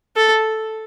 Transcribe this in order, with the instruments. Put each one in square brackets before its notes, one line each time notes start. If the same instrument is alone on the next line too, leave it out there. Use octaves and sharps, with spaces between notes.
[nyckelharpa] A4